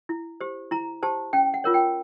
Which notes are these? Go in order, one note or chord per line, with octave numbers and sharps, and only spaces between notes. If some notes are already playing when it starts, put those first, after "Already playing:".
E4
G4 C5
E4 A#5
G4 C5 A5
C#4 G5
F#5
F4 A#4 C#5
G5